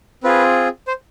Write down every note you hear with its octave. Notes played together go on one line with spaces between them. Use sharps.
C4 F4 G#4 B4
C5